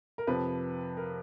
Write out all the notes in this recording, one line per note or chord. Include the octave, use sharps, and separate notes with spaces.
A#4
F2 C3 F3 B4
A#4